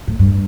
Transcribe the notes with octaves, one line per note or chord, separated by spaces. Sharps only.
A2
G2